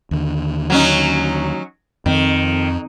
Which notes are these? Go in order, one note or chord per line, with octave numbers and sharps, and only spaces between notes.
D#2 D3
F#3 C#4 D#4
F2 D#3 C4